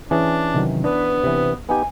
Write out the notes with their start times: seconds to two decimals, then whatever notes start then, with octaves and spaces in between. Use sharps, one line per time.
0.11 E3 C#4 D4 G#4
0.54 C3 D#3 F#3
0.84 B3 D4 B4
1.24 C3 E3
1.69 B3 D#4 G4 G#5